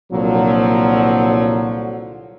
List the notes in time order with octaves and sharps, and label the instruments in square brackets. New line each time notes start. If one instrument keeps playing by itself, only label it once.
[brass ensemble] C2 A#2 D3 F3 F#3